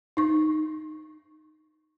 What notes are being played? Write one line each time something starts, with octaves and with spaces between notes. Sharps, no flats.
D#4 C#6